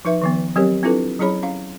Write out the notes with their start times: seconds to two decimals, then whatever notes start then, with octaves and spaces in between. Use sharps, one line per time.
0.05 F3 D#4 B4 E5
0.22 D#3 F3 B3
0.56 F#3 C4 G4 A#4 C#5
0.83 C4 D4 E4 F4 A4 B4
1.19 F#3 C#4 E4 G#4 C#5 B5
1.43 C#4 F5